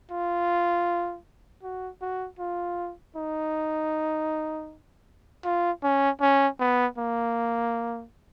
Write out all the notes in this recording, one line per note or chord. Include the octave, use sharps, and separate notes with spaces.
F4
F#4
F#4
F4
D#4
F4
C#4
C#4
B3
A#3